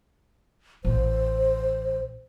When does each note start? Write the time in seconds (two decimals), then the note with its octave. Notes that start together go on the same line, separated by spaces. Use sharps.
0.85 A1 C5